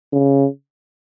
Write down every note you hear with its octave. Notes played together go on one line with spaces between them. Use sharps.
C#3